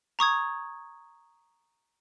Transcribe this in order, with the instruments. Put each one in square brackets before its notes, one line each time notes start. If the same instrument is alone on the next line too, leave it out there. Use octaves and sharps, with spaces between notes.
[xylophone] A#5 C#6 D#6 G#6